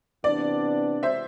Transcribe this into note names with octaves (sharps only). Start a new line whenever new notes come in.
C3 E3 B3 D4 D5
C5 E5